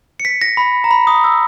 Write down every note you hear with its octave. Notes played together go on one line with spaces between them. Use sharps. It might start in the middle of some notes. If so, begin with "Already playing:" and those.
C#7
B6
A#6
B5
A#5
B5
D#6
E6